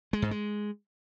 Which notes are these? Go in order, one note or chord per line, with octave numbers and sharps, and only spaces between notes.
G#3
G#2
G#3